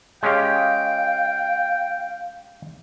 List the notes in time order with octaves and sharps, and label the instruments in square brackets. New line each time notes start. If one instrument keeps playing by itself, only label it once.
[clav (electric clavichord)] G#3 C#4 G4 [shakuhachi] F5 [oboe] G5